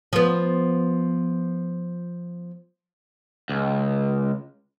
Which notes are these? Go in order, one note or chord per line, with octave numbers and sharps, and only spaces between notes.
F3 B3
C#2